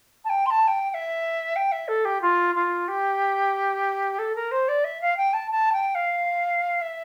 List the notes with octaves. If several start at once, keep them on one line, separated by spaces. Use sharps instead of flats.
A5
G5
C6
A5
G5
G5
E5
G5
E5
A4
G4
F4
F4
G4
A4
A#4
C5
D5
E5
F5
G5
A5
A5
G5
F5
E5